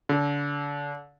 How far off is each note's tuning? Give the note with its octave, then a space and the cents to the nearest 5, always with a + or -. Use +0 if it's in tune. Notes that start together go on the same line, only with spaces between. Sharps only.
D3 -35